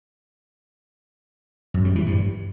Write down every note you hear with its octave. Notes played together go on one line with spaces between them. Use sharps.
F#2
G3
E3
G2